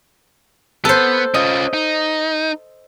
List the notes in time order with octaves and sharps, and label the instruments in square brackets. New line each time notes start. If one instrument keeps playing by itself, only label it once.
[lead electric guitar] B3 [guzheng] A4 C5
[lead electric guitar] C#4 F4 [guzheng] D#5
[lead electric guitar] D#4